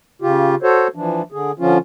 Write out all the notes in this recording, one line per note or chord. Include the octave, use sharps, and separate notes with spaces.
C#3 F4 G4
F#4 A4 C5 C#5
E3 F3 D4
D3 G#4
D3 F3 C#4 F4